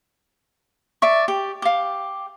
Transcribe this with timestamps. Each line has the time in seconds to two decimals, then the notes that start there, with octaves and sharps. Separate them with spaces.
1.02 D5 E5 C#6
1.28 G4
1.62 G4 F5